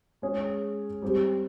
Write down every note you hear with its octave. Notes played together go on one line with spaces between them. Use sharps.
G#3 C#4 G#4
G3 C4 G4